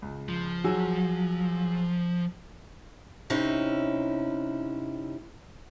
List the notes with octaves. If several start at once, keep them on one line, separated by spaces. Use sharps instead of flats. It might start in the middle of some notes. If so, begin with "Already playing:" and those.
C#2
F3
F#3 G#4 E6
C3 C#4 D#4 E4